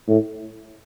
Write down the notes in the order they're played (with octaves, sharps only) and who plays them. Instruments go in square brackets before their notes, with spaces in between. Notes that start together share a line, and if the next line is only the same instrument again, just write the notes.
[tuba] A2